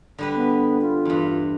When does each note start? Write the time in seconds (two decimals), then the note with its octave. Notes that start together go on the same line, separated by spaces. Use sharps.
0.18 D3 G3 B4
0.35 B3
0.81 F4
1.05 E2 G2